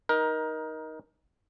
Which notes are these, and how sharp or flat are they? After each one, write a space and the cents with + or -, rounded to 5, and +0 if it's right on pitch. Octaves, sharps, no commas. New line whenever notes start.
D#4 +10 A#4 +20